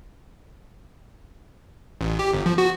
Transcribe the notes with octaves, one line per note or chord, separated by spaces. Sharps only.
A1
G4
G1
F3
F#4